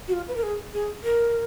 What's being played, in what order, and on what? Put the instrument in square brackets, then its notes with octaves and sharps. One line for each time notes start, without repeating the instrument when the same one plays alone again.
[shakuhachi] F#4
F4
B4
A#4
G#4
G#4
A#4